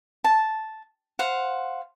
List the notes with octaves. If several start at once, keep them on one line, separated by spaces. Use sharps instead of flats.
A5
C5 F5 F#5